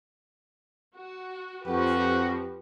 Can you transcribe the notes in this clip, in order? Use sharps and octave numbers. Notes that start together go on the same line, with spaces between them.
F#4
F2 F3 F#4 G4 B4